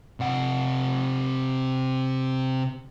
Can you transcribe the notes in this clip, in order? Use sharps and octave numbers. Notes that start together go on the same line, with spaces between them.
C3 F#5